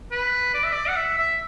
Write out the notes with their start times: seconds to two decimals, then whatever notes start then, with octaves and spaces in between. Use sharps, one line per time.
0.11 B4
0.54 D5
0.63 E5
0.73 D5
0.88 F#5
0.96 E5
1.17 E5